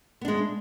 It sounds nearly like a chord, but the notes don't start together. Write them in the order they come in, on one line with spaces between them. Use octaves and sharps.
B3 D4 G#3